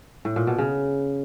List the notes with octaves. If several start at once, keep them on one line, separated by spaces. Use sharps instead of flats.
A2
A#2
B2
C#3